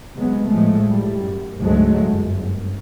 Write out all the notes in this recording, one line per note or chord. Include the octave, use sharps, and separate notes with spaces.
C3 F#3 G#3 B3
A2 F3 G#3 A3
A2 G3
F#2
D2 G#2 F#3 G#3 A3
G1 F#2